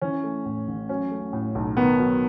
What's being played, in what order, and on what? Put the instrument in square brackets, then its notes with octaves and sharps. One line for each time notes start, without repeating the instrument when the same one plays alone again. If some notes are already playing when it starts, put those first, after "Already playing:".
[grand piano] E3 C#4
A3
A2
A1
F#3 C#4
A3
A2
B1
D#3 B3
F#3